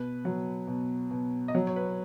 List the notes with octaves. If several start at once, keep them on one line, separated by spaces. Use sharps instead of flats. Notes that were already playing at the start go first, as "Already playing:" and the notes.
Already playing: B2 B4
F#3
B2
B2
D#5
F#3 C#5
C#5
B4